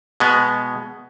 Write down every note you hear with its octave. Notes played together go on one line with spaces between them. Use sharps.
B2 G#3 B3